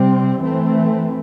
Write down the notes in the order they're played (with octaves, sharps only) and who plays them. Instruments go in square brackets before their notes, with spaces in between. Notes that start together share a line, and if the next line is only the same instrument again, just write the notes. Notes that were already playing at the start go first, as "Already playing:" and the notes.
Already playing: [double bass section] C3 G3 C4
E3 A3 C4